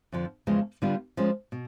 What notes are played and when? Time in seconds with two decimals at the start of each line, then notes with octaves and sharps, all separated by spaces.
0.12 F2 D3 F3
0.47 E2 C#3 F3 G#3
0.82 D3 G3 B3 D4 F4
1.17 F3 G#3 C#4
1.52 B2